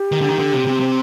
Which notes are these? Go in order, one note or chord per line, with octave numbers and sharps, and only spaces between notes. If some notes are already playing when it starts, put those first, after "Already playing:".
Already playing: G4
D#3
D3
D#3
D3
C3
C3
C3